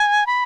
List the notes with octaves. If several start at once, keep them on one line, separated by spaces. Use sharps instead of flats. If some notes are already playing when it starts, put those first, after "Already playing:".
Already playing: G#5
B5